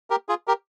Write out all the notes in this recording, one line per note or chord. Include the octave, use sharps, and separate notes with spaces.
G4 A#4
F4 G#4
G4 A#4